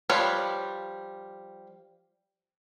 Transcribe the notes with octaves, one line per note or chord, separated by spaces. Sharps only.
F3 G3 B4 C#5